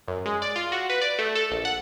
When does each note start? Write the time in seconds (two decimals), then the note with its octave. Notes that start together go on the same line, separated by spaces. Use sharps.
0.08 F#2
0.26 G#3
0.42 D5
0.56 F4
0.72 F#4
0.90 B4
1.01 D5
1.19 A3
1.35 A4
1.51 A#1
1.65 F#5